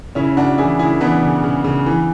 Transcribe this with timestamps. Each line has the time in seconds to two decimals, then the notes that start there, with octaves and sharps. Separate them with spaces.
0.15 C#3 C#4 E4
0.37 C#3 D4 F#4
0.58 E3 E4 G#4
0.79 C#3 E4 G#4
1.00 E3 B3 D4
1.22 C#3
1.44 C#3
1.64 C#3
1.86 E3